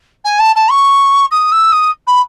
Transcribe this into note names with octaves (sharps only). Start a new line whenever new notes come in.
G#5
A5
A5
C#6
D#6
E6
D#6
B5